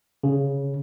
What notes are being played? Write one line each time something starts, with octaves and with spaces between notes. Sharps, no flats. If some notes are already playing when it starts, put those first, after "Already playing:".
C#3